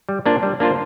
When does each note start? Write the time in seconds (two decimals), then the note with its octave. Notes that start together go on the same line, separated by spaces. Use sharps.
0.09 G3
0.26 A#3 D4 F4 C5
0.43 G3
0.60 A#3 D4 F4 C5